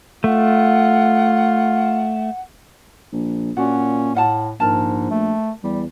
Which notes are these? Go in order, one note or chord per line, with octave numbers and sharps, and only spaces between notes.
A3 F4 F#5
A#1
A#2 C#4 D4 F#4 F#5
A2 F4 F#5 A5
A#1 G#2 A#4 A5
A3
E2 G3